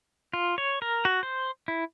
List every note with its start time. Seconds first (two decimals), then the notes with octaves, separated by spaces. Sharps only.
0.34 F4
0.58 C#5
0.82 A#4
1.05 F#4
1.23 C5
1.68 E4